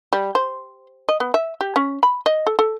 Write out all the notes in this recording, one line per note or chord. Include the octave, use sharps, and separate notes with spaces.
G3
C5
D#5
B3
E5
G4
C#4
B5
D#5
A4
A4